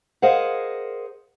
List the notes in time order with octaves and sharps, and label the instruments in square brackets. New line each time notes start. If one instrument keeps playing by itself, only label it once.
[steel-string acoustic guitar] G#4 A#4 C5 D#5 F5 F#5